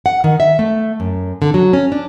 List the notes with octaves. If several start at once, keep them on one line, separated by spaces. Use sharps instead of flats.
F#5
D#3
E5
A3
F#2
D3
F#3
C#4
D4